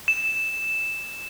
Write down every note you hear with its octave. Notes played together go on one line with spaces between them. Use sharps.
E7